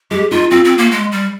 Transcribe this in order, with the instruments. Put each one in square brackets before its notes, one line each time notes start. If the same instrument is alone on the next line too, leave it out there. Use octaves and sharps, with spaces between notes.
[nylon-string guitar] G#3 [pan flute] G4
[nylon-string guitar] D#4 [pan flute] F4
[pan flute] C4 [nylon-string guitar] F4
[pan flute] C4
A#3
G#3
G3